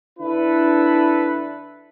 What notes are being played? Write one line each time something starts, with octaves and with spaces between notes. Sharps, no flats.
D3 D4 E4 A4 B4